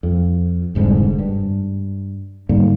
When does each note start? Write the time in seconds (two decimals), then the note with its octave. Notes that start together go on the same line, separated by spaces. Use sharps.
0.03 F2
0.75 F1 G#2 D3 G3
1.19 G2
2.49 G#2 D3 G3 A#3